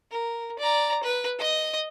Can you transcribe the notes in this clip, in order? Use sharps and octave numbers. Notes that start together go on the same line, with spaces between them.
A#4
D5 A#5
B4
D#5 D#6